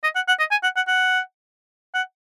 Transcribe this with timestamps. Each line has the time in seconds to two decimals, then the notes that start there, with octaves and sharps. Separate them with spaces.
0.04 D#5
0.16 F#5
0.28 F#5
0.39 D#5
0.51 G#5
0.63 F#5
0.76 F#5
0.88 F#5
1.95 F#5